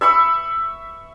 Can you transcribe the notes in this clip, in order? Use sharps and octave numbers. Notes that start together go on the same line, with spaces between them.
E5 B5 C#6 E6